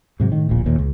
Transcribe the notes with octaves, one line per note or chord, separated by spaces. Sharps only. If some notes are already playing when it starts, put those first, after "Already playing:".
G#2 C3 F#3
A2 D#3
D1 A#1 A#2
D#2 A#2
C#2